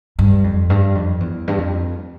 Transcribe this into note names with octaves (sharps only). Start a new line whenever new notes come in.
G2
F2
G2
F2
E2
G2
F2